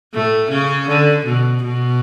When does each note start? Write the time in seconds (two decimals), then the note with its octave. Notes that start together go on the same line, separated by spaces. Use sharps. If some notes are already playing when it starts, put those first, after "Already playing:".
0.14 A2 A3
0.51 C#3 C#4
0.89 D3
1.26 B2
1.63 B2